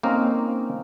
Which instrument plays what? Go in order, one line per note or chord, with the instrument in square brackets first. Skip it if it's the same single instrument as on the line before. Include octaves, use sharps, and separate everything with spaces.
[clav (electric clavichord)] A#3 C4 C#4 D#4 A#4